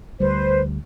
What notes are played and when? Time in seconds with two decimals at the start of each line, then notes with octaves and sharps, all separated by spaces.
0.20 D2 G3 B4 C5